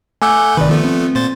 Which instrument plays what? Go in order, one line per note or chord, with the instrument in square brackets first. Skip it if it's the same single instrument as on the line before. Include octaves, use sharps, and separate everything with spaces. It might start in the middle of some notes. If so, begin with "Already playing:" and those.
[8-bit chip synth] A3 F#5 G6 [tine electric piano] G#5 D6 E6
[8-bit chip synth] G1 C3 B4 [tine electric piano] D#3 D5
[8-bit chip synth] F3 A3 B3
[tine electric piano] C4
[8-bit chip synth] A#2 C5 A6